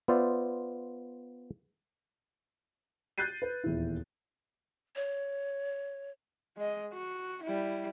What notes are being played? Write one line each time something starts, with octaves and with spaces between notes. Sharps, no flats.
B3 F4 C5 D5 E5
F#6 G6 A6 C7 D#7
B4
D#1 E2 E4
C#5
G#3 D#5
F#4
G3 E4